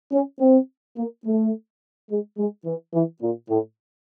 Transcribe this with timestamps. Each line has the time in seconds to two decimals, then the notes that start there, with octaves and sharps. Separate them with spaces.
0.12 C#4
0.40 C4
0.96 A#3
1.25 A3
2.09 G#3
2.37 G#3
2.65 E3
2.93 E3
3.21 A#2
3.49 A2